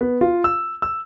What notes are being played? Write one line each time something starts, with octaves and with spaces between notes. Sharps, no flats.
B3
F4
E6
E6